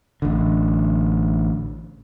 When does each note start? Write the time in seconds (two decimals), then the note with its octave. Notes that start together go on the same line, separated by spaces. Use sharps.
0.22 A1 D3